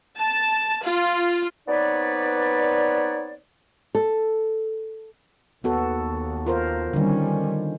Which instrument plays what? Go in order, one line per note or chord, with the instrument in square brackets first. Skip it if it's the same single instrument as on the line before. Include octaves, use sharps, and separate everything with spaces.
[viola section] A5
F4
[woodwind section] B3 C4 D#4 B4 C#5 D5
[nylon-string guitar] A4
[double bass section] D#2 [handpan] B3 F#4 A4
[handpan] F4 A#4 C5
[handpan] D3 D#3 [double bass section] G3 C#4